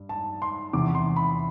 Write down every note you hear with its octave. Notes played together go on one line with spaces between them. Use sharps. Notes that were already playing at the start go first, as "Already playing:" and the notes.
Already playing: G2
A5
C6
E2 C3 E3 D6
C6
B5